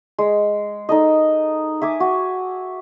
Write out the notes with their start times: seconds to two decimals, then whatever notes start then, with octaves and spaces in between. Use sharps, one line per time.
0.18 G#3
0.89 D#4 A4 D#5
1.82 E5 G#5 D6 D#6
2.00 F#4